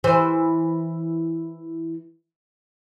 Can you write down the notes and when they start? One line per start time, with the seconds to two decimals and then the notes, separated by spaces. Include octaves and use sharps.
0.04 E3 C5